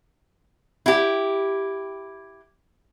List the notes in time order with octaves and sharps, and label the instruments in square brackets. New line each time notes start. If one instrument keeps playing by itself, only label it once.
[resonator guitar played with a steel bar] E4 G4